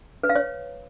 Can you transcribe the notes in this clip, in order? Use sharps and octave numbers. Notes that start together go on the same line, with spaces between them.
B4
F5
C#5